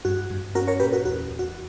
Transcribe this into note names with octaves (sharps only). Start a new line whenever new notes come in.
G2 F#4
G2
C#4 F#4 A#4
A#4 C#5
A#2 G4 B4
F#4 A#4
E2 F#4
E2
F#4